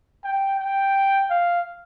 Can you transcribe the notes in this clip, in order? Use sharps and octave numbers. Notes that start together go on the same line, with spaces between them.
G5
G5
F5